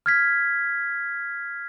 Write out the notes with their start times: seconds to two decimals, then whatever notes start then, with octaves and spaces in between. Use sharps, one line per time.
0.06 F6 G#6 B6